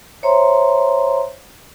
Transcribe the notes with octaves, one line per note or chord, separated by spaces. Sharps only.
C5 C#5 E5 A#5 C6